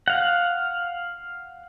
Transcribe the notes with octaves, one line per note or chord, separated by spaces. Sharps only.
F5 F#5